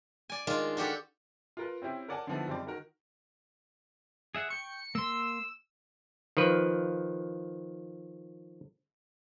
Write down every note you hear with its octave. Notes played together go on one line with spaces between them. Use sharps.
D5 G#5
D#3 G#3 D4 D#4 F4
D4 F#4 G4 A4
F4 A#4 B4
C4 C#4 E4 G4
A#4 C#5 D5 F#5 G#5 A5
D3 D#3 F3 B3 E4
F#1 G3 C4 D#4 D5
D#3 F#4 A#4
G#4 E5 F#5
G5 C#6 C#7
A#3 C6 E6
D#3 F3 B4